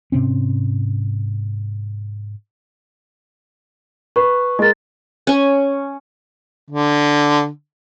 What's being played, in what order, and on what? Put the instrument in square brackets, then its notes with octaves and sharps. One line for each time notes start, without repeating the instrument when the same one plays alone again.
[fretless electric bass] G#2 C3 C4 C#4
[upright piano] B4 [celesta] C#6
[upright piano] G#3 A#4 [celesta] D#5 A6
[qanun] C#4 G#5
[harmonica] D3